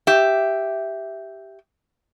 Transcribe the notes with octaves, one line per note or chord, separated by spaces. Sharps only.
G4 E5